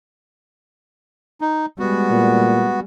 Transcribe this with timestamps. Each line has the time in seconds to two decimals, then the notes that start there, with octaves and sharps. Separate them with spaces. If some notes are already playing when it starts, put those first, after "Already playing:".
1.41 D#4
1.79 G3 G#3 B3 F#4
2.10 A#2